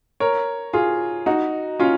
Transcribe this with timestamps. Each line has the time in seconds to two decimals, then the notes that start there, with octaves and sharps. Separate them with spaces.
0.20 A#4 C#5
0.73 F4 G#4
1.26 D#4 F#4
1.80 C#4 F4